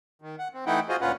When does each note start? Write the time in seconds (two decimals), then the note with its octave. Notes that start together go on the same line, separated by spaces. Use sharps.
0.22 D#3
0.39 F#5
0.54 C4
0.66 E3 A3 D#4 E4 F#5 G5
0.89 F4 F#4 G#4 C5 D#5
1.01 D2 A#2 C#4 F4 B4 F#5